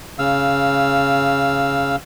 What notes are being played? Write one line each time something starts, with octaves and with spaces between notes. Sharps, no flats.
C#3 F5 E6